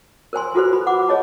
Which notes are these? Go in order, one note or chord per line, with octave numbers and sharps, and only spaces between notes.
A#4 C5 G#5 C6
F4 F#4 A4 B4 C5
B5
F#5 D6
G#4 C#5 D#5 A5